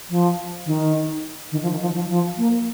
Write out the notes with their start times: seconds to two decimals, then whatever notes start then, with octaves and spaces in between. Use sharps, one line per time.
0.10 F3
0.66 D#3
1.52 D#3
1.63 F3
1.71 D#3
1.81 F3
1.95 F3
2.10 F3
2.38 A#3